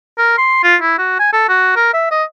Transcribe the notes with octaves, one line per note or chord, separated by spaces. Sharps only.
A#4
C6
F4
E4
F#4
G#5
A4
F#4
A#4
E5
D#5